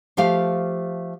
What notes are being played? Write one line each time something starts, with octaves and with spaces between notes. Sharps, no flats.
F3 A3 G4 F5